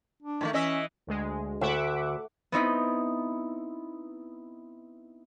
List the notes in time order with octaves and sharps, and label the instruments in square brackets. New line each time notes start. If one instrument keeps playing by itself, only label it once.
[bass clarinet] D4
[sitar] A2 D#3 A3
[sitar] E3 D#5 E5 [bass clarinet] C#4
[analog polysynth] D2 G#3
[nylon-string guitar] D2 [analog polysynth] E5 F#5 D6
[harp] B3 C4 D#4 E4